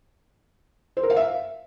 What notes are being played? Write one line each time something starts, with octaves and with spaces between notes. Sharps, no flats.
C5
A#4
F5
E5